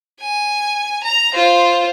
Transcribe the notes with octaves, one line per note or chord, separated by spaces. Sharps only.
G#5
A#5
F4 C5